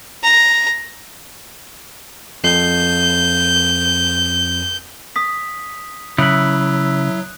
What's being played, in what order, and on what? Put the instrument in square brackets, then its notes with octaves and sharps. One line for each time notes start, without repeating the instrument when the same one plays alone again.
[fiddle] A#5
[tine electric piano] F2 C7 [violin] G6
[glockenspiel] D#6 B6
[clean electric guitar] C#3 [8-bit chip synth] F#3 [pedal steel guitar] E4 E5 [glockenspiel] D#6 F#6 F#7